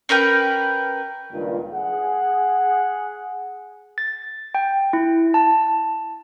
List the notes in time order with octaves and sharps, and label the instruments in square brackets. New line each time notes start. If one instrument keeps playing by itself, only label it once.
[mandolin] C#4 A#4 B4 G5
[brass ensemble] C#2 G2 A#2 D#3
G#4 F#5
[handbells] A6
G5
E4
A5